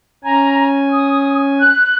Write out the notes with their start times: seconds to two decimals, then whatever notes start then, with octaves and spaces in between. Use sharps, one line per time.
0.24 C#4 G#5 A#5
0.90 D#6
1.59 F#6